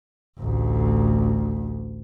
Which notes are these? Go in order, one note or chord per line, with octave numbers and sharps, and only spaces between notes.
A1 D2